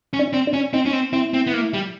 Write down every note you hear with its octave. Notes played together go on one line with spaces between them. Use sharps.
C#4
D4
C4
D4
C#4
C4 D#4
C#4
C4
C4 E4
C4
B3
A#3
G3